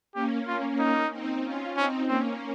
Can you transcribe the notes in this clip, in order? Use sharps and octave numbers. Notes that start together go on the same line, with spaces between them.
A#3 C#4 G4
A#3 C#4 F4
D#4
C4 D#4
C#4 F4
C4 C#4 D#4
A#3 C4 C#4